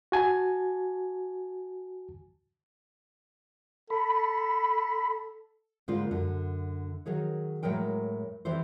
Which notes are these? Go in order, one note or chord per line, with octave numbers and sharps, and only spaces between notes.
F#4 G#5 A5
A4 B5
G#2 D3 G3 G#3 A#3 F4
F#2 D3
D#3 F#3 G#4 C#5
A2 F#3 G#3 A#4 G5
E3 G3 C4 A4 C5